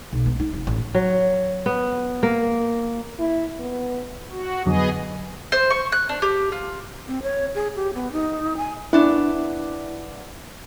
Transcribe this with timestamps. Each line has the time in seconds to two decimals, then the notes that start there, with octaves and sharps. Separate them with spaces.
0.13 B1
0.26 B3
0.40 D#4
0.53 F1
0.67 A1
0.95 F#3
1.66 B3
2.23 A#3
3.19 E4
3.59 B3
4.31 F#4
4.66 F2 D3 F#3 B3 G#4 D#5
5.52 C5
5.70 C#6
5.92 F#6
6.09 D4
6.22 G4
6.52 F4
7.08 C4
7.23 C#5
7.55 G#4
7.76 G4
7.94 B3
8.12 D#4
8.57 G#5
8.93 B3 D4 E4 E5